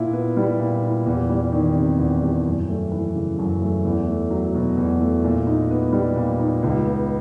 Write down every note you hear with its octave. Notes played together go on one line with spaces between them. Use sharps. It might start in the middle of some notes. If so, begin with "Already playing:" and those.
Already playing: A#2 E4
B3
G3
A#2
E4
E2
G3
D#3
C3
E2
G3
F#2
A3
E3
C#3
F#2
A3
E2
A3
F#3
B2
E2
A3
A#2
D#4
B3
G3
A#2
D#4
C#2
B3